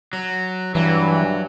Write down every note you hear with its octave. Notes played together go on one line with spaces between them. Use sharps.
F#3
G2 E3 F#3